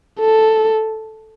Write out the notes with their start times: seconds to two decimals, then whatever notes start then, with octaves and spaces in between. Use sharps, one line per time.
0.20 A4